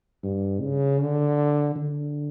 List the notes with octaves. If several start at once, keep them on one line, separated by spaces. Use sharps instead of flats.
G2
C#3
D3
D3